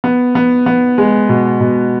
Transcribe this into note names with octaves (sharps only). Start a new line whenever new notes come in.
B3
B3
B3
G#3
B2
B2